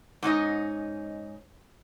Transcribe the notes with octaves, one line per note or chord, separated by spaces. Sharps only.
G#2 C#4 D#4 D#5